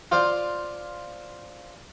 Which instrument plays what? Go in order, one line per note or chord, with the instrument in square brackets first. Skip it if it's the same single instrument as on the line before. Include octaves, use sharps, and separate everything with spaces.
[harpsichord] F4 C5 D5 F5